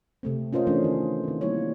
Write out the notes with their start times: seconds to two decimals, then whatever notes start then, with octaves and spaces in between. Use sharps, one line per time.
0.23 C3 A3 C4
0.53 C#4 F4 A#4 C5 D#5
0.67 E3 A3 C#4 D4
0.84 D#3
1.24 D#3 C4
1.41 G3 A#3 E4 C#5